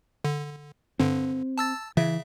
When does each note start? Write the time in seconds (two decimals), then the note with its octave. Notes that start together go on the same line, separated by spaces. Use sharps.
0.24 D3
1.00 G2 D3 C4
1.58 A5 E6 A6
1.97 C#3 E3 E5